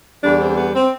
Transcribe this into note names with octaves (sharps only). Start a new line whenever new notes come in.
E2 D3 G3 D4
C4
B3
C4